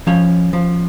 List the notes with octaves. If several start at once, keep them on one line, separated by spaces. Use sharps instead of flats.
F3 C#4 C#5
F3